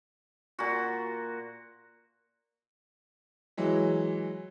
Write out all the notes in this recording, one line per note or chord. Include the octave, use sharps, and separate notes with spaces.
A#2 F#4
E3 F#3 G#3